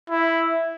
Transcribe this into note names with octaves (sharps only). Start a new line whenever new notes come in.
E4